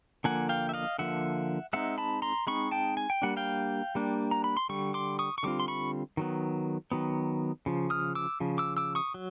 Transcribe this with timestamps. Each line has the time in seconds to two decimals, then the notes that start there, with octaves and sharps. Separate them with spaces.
0.24 D3 F3 A#3 F#5 G#5
0.49 F5 G5
0.69 E5
0.74 D#5 F5
0.99 D3 F3 A#3 E5 F#5
1.73 G#3 C4 D#4 E5 F#5
1.98 A5 B5
2.22 A#5 C6
2.47 G#3 C4 D#4 B5 C#6
2.71 G5 A5
2.97 G#5
3.10 G5
3.22 G3 A#3 D4 F#5
3.37 F5 G5
3.95 G3 A#3 D4
4.31 A#5
4.44 B5
4.57 C6
4.69 D3 G3 C#6
4.94 C6 D6
5.19 C#6 D#6
5.38 C#6
5.43 D3 G3 C4 F4 D6
5.60 C6
5.68 B5 C#6
6.17 D#3 F#3 B3
6.92 D#3 F#3 B3
7.66 C#3 F3
7.90 D#6 F6
8.15 D6 E6
8.40 C#3 F3
8.58 D6 E6
8.77 D6 E6
8.95 C#6 D#6
9.14 F#3